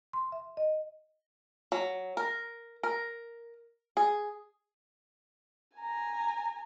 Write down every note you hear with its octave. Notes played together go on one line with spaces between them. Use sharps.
C6
E5
D#5
F#3
A#4
A#4
G#4
G#5 A#5